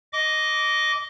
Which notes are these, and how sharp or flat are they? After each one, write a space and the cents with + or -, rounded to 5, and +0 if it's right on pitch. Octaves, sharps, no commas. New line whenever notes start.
D#5 +0 D6 -20